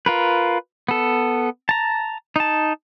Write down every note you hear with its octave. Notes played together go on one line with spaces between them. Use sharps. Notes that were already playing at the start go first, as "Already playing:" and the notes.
F4 A#4 B4
B3 A4
A5 A#5
D#4 A5